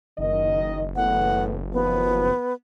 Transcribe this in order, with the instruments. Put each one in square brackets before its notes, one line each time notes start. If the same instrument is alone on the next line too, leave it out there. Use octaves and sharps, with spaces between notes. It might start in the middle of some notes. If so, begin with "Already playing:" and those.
[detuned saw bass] F#1 [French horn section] D#3 D#5
[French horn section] A2 E3 B3 [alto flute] F#5
[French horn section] D#2 F3 [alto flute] B3